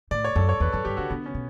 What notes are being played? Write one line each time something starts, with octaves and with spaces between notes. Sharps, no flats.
A2 D5
C#5
F#2 A4
C#5
E2 B4
F#2 A4
G2 G4
D3 F#4
D3 B3
C#4
B2